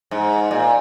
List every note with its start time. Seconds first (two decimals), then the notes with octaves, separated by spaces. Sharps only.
0.11 G#2
0.51 A#2